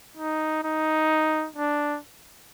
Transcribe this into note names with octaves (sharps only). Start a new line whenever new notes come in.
D#4
D#4
D4